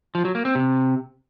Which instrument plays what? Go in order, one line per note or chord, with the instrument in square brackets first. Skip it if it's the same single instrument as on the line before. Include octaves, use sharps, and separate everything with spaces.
[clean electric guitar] F3
F#3
A#3
C4
C3